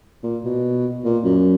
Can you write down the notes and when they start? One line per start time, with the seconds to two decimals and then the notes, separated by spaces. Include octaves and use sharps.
0.23 A#2
0.45 B2
1.04 A#2
1.24 F#2